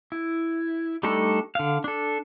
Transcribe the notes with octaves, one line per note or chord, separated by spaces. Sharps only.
E4
G3 A3 D4 D#4 A4
D3 F5
D4 A4